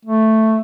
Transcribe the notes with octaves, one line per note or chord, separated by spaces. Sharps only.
A3